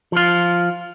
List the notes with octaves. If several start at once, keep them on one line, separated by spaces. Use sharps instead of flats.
F3 F4